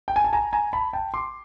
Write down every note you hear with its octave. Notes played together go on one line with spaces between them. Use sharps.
G5
G#5
A5
G#5 A#5
G#5 A#5
A5 B5
G5 A5
C6 D6